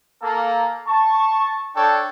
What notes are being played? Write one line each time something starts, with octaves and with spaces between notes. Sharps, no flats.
A#3 A4
A5 C#6
D4 A4 C#5 G5